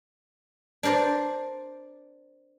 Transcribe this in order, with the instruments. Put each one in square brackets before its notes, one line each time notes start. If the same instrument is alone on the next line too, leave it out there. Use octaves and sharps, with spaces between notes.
[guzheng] D4 A#4 C5 D5